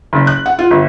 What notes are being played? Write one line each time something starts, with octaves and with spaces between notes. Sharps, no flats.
F#1
F#6
F#5
F4
G1